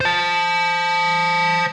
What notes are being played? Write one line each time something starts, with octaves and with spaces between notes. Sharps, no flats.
C5 A5